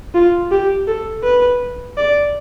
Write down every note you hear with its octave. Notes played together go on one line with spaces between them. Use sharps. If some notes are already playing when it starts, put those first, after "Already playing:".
F4
G4
A4
B4
D5